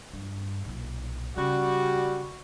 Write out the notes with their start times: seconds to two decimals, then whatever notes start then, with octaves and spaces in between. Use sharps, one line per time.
0.13 G2
0.65 B1 A#2
1.37 C#3 G3 F#4